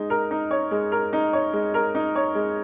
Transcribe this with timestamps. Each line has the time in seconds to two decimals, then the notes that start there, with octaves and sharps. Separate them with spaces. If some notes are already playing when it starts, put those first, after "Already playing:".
Already playing: G#3 D#4
0.10 A#4
0.31 D#4
0.51 C#5
0.71 G#3
0.92 A#4
1.13 D#4
1.33 C#5
1.53 G#3
1.74 A#4
1.95 D#4
2.15 C#5
2.35 G#3